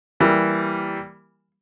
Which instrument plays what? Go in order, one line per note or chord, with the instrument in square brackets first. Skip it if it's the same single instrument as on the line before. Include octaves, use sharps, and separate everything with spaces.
[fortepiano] E3 G3 A#3